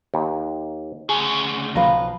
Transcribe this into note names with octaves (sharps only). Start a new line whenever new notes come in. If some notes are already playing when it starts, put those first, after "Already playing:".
D#2
D2 C#3 G#4
B1 F3 B4 F5 A#5